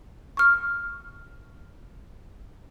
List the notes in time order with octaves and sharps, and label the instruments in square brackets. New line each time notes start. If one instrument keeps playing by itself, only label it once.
[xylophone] C#6 F6